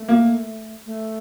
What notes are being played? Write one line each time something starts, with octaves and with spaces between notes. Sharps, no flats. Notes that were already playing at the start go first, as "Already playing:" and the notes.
Already playing: A3
A#3
A3